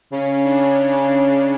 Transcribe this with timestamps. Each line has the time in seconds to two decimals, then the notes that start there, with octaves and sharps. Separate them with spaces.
0.12 C#3 C#4
0.44 D4